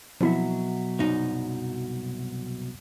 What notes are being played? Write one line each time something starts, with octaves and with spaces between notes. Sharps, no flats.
B2 F3 F#3 C4 E4 E5
C2 F#2 D#4